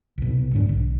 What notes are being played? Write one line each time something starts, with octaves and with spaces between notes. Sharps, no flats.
C2 B2
G#2 D3 C4 D4
B1